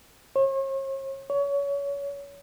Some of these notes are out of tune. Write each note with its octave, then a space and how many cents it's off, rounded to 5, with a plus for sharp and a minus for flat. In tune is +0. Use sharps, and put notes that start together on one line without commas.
C#5 -45
C#5 +25